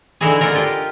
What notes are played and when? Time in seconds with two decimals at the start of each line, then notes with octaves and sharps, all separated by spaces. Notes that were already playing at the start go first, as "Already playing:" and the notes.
0.21 D3 E3 D#4 E4 F#4 G#4
0.40 F4 A#4 D5 F#5
0.55 F4 G4 D#5